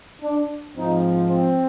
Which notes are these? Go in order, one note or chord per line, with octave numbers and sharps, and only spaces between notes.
D4
G#2 F3 C4 D#4
C4